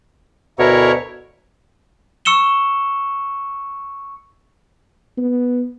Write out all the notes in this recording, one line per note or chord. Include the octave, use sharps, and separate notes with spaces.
D2 B2 E4 A#4 C#5
C#6 E6 C#7 E7 G7
B3